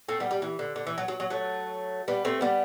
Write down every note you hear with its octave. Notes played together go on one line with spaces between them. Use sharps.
A3 C4
G3 B3
G3
E3
D3
D3
E3
F#3
F#3
F#3
F#3 A3
G3 B3
A3 C4
G3 B3